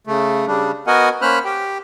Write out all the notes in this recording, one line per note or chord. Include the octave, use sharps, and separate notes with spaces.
C#3 A3
C#3 G3 D4
B3 F#4 A#4 D#5 F#5 G#5
A#3 C#4 C5 B5 F6 F#6
G4 G5